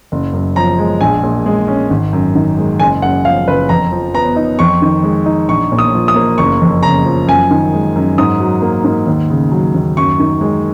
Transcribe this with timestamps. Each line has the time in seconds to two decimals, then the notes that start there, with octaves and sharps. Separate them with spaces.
0.12 F#1
0.33 F#2
0.56 F3 A#5
0.79 G#3
1.01 A#1 G#5
1.23 A#2
1.46 G#3
1.68 C#4
1.90 G#1
2.13 F#2
2.35 D#3
2.58 G#3
2.80 F#1 G#5
3.02 F#2 F#5
3.25 F3 F5
3.47 F#1 B4
3.69 F2 A#5
3.92 F3
4.14 B3 A#5
4.36 D#4
4.59 F2 C#6
4.82 D#3
5.03 G#3
5.26 D#4
5.48 A#1 C#6
5.72 A#2
5.79 D#6
5.94 F3
6.08 D#6
6.16 A#3
6.38 F#1 C#6
6.61 F2
6.83 C#3 A#5
7.05 F3
7.27 F#2 G#5
7.51 D#3
7.73 G#3
7.96 F#2
8.18 G#2 D#6
8.40 F#3
8.62 A#3
8.84 G#2
9.07 D#2
9.30 C#3
9.51 F#3
9.75 D#2
9.97 F#2 C#6
10.20 D#3
10.41 G#3